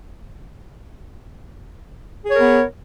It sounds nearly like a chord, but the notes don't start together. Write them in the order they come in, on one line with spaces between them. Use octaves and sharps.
G#4 C#5 A#4 B3